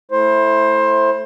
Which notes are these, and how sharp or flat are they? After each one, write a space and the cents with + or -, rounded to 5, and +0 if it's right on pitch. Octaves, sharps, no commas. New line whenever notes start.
A3 +0 E4 -5 C5 +20